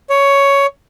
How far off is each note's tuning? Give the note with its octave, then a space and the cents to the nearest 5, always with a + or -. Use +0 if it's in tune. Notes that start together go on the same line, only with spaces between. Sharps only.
C#5 +10